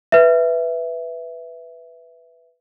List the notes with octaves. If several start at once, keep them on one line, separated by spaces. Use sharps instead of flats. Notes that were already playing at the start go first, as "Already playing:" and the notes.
B4 E5